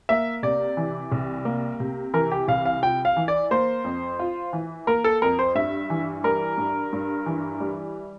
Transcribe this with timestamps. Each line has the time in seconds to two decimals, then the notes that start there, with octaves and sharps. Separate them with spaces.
0.09 A#3 E5
0.43 C3 D5
0.77 E3
1.12 C2
1.45 A#3
1.80 C3
2.14 E3 A#4
2.32 G4
2.48 C2 F5
2.65 F5
2.82 F4 G5
3.05 F5
3.16 E3
3.28 D5
3.51 A#3 C5
3.84 F2
4.19 F4
4.53 E3
4.87 A#3 A#4
5.04 A4
5.22 F2 A#4
5.39 C5
5.55 G2 E5
5.90 E3
6.24 G3 A#4
6.58 G2
6.93 G2
7.26 E3
7.60 G3